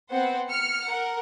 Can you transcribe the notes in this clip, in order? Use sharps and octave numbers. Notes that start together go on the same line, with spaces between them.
B3 C4 C5 F#5
F6 C#7
A#4 F#5